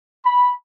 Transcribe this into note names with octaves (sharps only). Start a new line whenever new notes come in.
B5